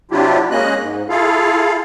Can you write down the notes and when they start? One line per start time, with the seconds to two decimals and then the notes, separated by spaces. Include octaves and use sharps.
0.11 C3 F#3 D4 E4 F4 G4
0.51 G#3 A#3 C#4 D#5 F#6
0.81 G#2
1.09 E4 F4 G#4 A4 F5